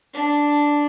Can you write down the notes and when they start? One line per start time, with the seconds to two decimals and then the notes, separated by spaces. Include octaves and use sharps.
0.14 D4